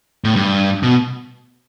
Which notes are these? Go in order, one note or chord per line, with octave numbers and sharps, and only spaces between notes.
A2
G2
B2